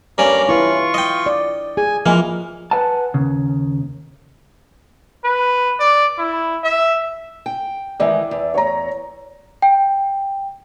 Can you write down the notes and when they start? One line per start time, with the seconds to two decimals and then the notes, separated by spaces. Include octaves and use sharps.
0.18 G2 A#3 C#4 D5 A#5 D6
0.49 E4 F4 B4 C#6
0.94 D#5 G5
1.26 D5
1.77 G#4 G#5
2.06 E3 F3 G#3 A#3 F6
2.71 B4 F#5 G#5 A5
3.14 D#2 C#3
5.24 B4
5.80 D5
6.18 E4
6.64 E5
7.46 G5
8.00 D#3 E3 G#3 D5 E5
8.31 E2
8.54 C#5 A#5
9.62 G5